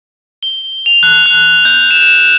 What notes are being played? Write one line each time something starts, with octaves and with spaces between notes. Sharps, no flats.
G7
F7
F#6
F#6
G6
E7